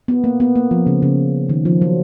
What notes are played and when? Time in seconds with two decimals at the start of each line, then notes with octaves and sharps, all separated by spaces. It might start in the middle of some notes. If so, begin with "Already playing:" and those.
0.08 B3
0.24 A#3
0.40 B3
0.55 A#3
0.71 F3
0.87 C#3
1.02 C#3
1.49 D#3
1.65 F3
1.82 F#3